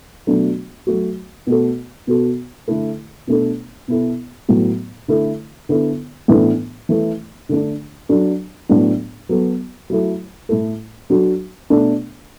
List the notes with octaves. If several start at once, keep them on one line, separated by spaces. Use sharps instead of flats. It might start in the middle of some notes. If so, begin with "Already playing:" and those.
B2 F#3 A3 D4 F#4
F#3 A3 F#4
B2 A3 F#4 A4
B2 B3 F#4 A4
D3 A3 E4 A4
B2 A3 D4 A4
B2 B3 E4 A4
A2 F#3 B3
D3 A3 E4 A4
D3 B3 E4 A4
A2 E3 B3 D4 A4
E3 A3 E4
D3 A3 D4
F#3 D4 A4
A2 F#3 B3 D4
F#3 B3 F#4 A4
F#3 A3 E4 A4
A2 A3 E4 A4
F#3 D4 F#4 A4
B2 A3 D4